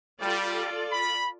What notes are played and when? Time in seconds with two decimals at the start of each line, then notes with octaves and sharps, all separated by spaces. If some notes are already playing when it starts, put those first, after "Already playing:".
0.21 G3 F4 A4 D5
0.92 B5